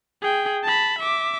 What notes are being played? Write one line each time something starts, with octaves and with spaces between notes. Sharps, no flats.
G#4 G5
A5 B5
E5 D6